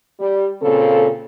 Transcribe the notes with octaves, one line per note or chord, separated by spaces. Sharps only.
G3
A#2 C#3 C4 A4